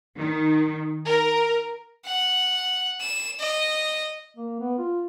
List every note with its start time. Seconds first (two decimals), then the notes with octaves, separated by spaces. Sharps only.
0.16 D#3
1.07 A#4
2.05 F#5
3.00 E7
3.40 D#5
4.37 A#3
4.60 B3
4.78 F4